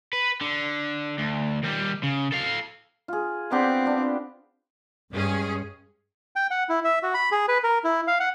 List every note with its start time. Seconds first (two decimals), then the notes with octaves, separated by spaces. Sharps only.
0.13 B4
0.41 D3
1.19 D2
1.63 D#2 G3
2.03 C#3
2.32 A4 F5
3.08 F4 G#4
3.51 B3 C4 D4 G4
3.85 B3 D4
5.12 G2 G#3 C#4 G#4
6.36 G5
6.51 F#5
6.69 E4
6.84 E5
7.03 F#4
7.14 B5
7.32 G#4
7.48 B4
7.64 A#4
7.84 E4
8.07 F5
8.20 F#5